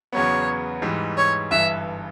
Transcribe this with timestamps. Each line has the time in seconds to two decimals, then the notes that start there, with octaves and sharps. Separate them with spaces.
0.13 E2 C#3 F#3 B3 C#5
0.82 G#2 E3 G3
1.17 C#5
1.50 G1 G2 E3 E5